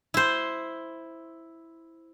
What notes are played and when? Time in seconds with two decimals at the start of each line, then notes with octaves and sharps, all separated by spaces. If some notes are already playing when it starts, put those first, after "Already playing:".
0.14 E4 C5